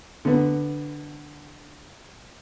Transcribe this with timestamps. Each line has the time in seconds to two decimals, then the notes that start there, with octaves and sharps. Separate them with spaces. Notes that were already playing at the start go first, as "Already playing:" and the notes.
0.25 D3 B3